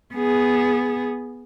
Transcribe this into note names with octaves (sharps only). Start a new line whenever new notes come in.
B3 G#4